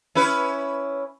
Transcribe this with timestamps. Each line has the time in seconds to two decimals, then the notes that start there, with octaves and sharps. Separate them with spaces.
0.15 C#4 E4 B4